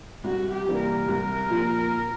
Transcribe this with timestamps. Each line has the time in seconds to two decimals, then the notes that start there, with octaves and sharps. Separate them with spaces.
0.24 C2 F#4
0.52 G4
0.67 C3 E3 G3 A#3
0.80 A#4
1.08 C2
1.50 A#2 F3